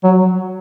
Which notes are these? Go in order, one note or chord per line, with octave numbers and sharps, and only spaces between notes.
F#3